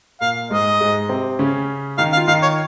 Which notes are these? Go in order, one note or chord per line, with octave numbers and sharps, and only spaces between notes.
A#2 A#3 F5
G#2 G#3 D#5
G#2 G#3
C3 C4
C#3 C#4
D#3 D#4 F5
F5
F4
D#3 D#4 F5
C#5